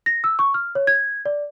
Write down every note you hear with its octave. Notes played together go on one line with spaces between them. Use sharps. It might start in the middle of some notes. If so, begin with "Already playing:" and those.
A#6
E6
C#6
F6
C#5
G#6
D5